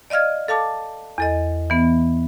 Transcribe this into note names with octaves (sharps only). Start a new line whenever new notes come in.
D5 D#5 F5 F6 G#6
A4 F5 A5 D6
E2 A4 D#5
E3 B3